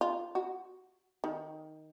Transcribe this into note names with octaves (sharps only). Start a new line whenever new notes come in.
F4
F#4
D#3